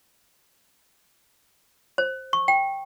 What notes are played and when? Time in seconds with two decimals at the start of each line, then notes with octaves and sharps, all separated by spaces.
1.98 C5
2.33 C#6
2.48 G5